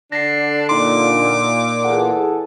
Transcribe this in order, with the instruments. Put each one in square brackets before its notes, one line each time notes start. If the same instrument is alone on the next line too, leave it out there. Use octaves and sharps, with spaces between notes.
[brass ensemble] D3 [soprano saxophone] D4 [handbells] A#6 C7
[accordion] A#2 [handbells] D#4 C6 [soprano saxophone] D6
[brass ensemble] E2 G#4 A4 [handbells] F#5